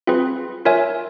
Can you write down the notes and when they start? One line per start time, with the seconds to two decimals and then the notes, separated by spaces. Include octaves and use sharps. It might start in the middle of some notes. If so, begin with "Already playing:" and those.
0.07 C4 F4 G#4 B4
0.65 F4 A#4 C#5 E5 G#5